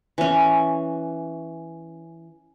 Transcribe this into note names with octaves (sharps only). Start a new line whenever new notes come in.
E3 C#4